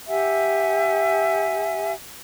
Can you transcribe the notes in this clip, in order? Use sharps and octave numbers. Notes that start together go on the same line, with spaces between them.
G4 E5 F#5 G#5